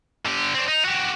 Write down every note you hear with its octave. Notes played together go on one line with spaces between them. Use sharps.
D3 G4
C4 D4
D#4
F#4 G4